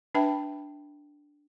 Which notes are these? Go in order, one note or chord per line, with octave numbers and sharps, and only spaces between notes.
D4 B4 E5 G5 A5 B5